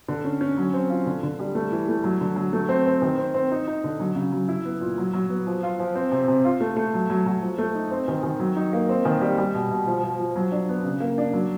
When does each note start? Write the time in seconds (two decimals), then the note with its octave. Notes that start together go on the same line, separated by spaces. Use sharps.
0.08 D3
0.24 C#4
0.41 C#4
0.58 F#3
0.73 C4
0.90 F4
1.06 D3
1.23 D3
1.39 G3
1.55 A3
1.72 E3
1.88 A3
2.04 F#3
2.21 D3
2.36 F#3
2.53 A3
2.69 C4
2.86 C4
3.02 D#3
3.18 C4
3.34 C4
3.51 D#4
3.67 D#4
3.84 D3
4.00 F#3
4.15 C#3
4.32 F#3
4.48 E4
4.65 B3
4.81 A#2
4.98 F#3
5.13 F#3
5.30 B3
5.47 F3
5.63 F4
5.79 F3
5.95 C4
6.12 C3
6.28 C3
6.45 F4
6.61 A3
6.76 A3
6.94 F#3
7.10 F#3
7.26 F#3
7.42 F3
7.58 A3
7.75 D#4
7.91 C4
8.08 D#3
8.23 D#3
8.40 F#3
8.56 D#4
8.73 A#3
8.89 C4
9.05 D#3
9.21 G3
9.38 G3
9.54 B2
9.71 B2
9.87 F3
10.04 F3
10.19 F3
10.36 F#3
10.52 D4
10.69 B3
10.84 C#3
11.00 A#3
11.18 D4
11.33 F#3